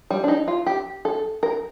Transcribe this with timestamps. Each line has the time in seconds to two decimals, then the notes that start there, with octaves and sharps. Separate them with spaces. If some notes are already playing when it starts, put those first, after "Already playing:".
0.10 G3
0.24 D4
0.28 D#4
0.48 F4
0.66 G4
1.05 A4
1.43 A#4